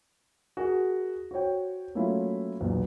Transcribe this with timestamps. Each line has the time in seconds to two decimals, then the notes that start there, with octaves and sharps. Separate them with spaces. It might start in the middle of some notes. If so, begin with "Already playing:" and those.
0.57 F#4 G#4 A#4
1.31 F#4 C5 C#5 G5
1.95 F#3 A3 A#3 C#4 E4 F4
2.60 B1 E2 A#2